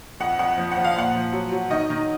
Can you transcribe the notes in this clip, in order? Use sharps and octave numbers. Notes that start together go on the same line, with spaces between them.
F2 F#5
F2 F#5
F3
F#5
F3
F5
A#2 F#5
F3
F#3
F#3
D#3 D#5
D#3